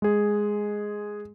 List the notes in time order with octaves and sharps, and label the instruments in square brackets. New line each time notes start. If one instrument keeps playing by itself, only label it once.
[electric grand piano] G#3 G#4